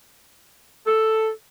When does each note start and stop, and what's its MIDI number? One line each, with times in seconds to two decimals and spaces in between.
0.86 1.28 69